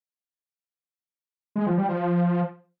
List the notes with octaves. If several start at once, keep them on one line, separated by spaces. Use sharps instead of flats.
G#3
F3
G3
F3